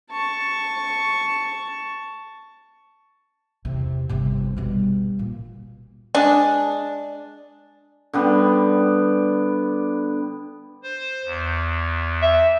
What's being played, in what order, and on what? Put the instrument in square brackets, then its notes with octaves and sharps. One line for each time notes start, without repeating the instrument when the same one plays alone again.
[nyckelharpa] A5 C#6
[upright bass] E2 C3
G1 C3
B2 G3
A#2
[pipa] G#3 D4
[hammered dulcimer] D3 G3 B3
[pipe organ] C5
E2
[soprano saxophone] E5